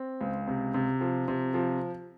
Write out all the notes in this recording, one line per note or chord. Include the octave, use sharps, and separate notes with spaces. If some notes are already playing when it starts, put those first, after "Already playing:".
Already playing: C4
C#2
C3
C3
F3
C3
F3